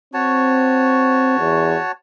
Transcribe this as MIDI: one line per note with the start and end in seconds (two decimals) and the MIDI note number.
0.14 1.36 60
0.14 1.92 66
0.14 1.92 73
0.14 1.92 81
1.39 1.77 40